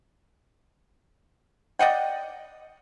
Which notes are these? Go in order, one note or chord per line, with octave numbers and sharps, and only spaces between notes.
D5 D#5 F#5 G5